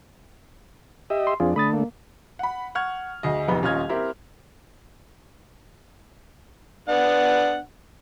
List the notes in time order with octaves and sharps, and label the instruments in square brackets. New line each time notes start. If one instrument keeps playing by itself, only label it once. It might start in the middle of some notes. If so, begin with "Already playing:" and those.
[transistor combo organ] G4 D#5 E5
[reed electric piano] C6
[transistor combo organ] F2 D4 [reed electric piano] C4 F4 G#4
[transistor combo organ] D3 A3 [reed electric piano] B5 D#6 A6
[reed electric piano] A#3
[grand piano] F#5 B5
F#5 C#6 F6 G#6
D2 G#4 D#5
F1 A#1 B3 D#4 B5
D#1 C#4 F4 D#5 F6 G#6
C4 E4 G4 A#4
[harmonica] B3 D4 F#5